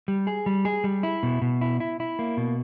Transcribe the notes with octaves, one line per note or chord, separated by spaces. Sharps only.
G3
G#4
G3
G#4
G3
E4
B2
B2
E4
E4
E4
A#3
B2